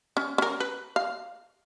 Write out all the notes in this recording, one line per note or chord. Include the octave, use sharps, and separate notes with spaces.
C#4
C#4 A#4
B4
F5